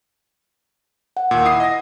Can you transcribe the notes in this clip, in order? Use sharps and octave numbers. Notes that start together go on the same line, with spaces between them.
F#5
D#2 A#2
E4 D#6 C7
D#5 A#6